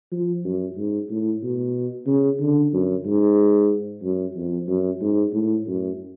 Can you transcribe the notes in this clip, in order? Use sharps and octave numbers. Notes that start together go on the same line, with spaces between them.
F3
F#2
G#2
A2
B2
C#3
D3
F#2
G#2
F#2
F2
F#2
G#2
A2
F#2